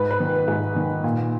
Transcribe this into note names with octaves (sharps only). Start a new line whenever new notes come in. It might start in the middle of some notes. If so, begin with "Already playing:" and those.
Already playing: G#2 B4
B4
D#3
G#2
D#3
A#2